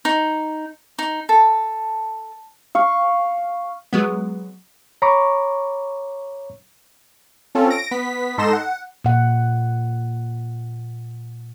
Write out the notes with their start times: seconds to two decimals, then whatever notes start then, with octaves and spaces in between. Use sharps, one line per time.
0.05 D#4
0.99 D#4
1.29 A4
2.75 F5 C#6
3.93 F#3 G#3 B3
5.02 C#5 A#5 B5 C#6 D6
7.55 C4 C#4 F4 A4
7.70 A#6 D7
7.91 B3 B6
8.38 G#2 D#4 A4 C6 A#6 E7
8.53 F#5
9.05 A#2 F#5